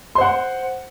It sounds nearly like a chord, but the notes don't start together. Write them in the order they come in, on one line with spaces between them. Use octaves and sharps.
C6 C5 F#5